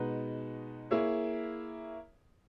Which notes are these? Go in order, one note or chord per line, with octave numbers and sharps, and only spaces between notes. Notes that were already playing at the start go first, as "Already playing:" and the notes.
Already playing: B2 G#3 D#4 F#4 B4
A#3 E4 G#4 C#5 E5